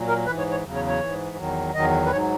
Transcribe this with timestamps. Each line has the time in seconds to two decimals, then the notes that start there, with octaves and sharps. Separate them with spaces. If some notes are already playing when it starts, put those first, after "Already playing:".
Already playing: A#2 F#3
0.08 A#4
0.26 G#2 E3 B4
0.38 C#5
0.51 C#5
0.64 E2 C#3 F#3
0.76 C#5
0.88 C#5
1.01 G#2 E3
1.37 E2 D#3 F#3
1.74 E2 D#3 F#3 D#5
2.06 B4
2.11 G#2 F#3 C#5